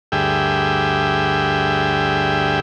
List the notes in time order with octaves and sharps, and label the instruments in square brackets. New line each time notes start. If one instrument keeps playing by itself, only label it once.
[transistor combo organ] D2 G2 G#4 E5 G5